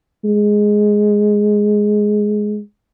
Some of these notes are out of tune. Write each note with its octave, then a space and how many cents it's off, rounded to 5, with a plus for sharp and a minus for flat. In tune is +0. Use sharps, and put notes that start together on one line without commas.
G#3 +5